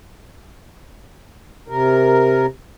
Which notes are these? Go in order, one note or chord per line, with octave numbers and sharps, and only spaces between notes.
C3 A#4